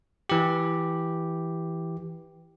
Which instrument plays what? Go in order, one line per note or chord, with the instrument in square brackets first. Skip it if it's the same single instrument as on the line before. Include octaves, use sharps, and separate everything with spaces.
[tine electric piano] E3 G4